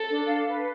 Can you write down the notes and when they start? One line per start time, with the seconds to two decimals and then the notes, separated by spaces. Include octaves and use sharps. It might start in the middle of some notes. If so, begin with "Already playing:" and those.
Already playing: A4
0.09 D4
0.28 F5
0.48 B4